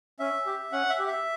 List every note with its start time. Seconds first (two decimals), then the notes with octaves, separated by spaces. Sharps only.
0.20 C#4 E5
0.46 G4
0.72 C#4 F#5
0.90 E5
0.99 G4
1.08 E5